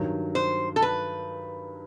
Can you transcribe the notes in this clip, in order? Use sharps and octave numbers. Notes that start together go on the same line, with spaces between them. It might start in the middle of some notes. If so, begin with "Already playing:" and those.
Already playing: G2 D#3 F#3
C5
A4
B4